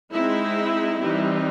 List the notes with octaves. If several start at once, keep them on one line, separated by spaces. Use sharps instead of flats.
G#3 C4 D#4 E4
E3 G3 C4 D#4